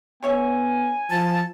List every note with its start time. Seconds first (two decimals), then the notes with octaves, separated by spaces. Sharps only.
0.23 D3 B3 C#5 E5 G#5
1.10 F3 A5